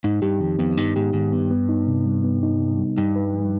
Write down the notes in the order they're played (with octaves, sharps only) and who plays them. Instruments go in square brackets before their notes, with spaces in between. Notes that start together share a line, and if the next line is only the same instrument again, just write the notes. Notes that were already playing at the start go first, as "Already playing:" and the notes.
[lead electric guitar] G#2 [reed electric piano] D#4
[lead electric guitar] G2 [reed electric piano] G4
[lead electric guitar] F2 [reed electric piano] D#3
[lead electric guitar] F2 [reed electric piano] B3
[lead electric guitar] G2 [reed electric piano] D#4
[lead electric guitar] G#2 [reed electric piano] G4
[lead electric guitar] G#2 [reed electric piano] D#3
[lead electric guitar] G2 [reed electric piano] B3
[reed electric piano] B3
D#4
C3
G3
B3
D#4
C3
G3
[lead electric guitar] G2 [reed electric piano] D#4
[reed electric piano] B4
F3